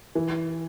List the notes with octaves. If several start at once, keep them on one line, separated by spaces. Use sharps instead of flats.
E3